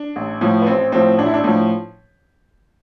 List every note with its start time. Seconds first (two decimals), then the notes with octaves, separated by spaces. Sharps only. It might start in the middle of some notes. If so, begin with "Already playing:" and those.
Already playing: D4
0.16 A1
0.41 A2 F3
0.62 B3
0.67 A1 C4
0.92 A2 F3 C4
1.18 A1 D4
1.26 E4
1.34 D4
1.44 A2 F3